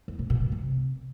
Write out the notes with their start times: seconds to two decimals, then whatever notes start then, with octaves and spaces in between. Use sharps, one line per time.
0.08 E2
0.19 B2
0.30 B2
0.41 B2
0.52 C3